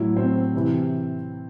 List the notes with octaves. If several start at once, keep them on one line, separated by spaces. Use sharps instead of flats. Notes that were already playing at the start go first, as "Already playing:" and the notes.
Already playing: A2 F#3 E4
C4
C3 E3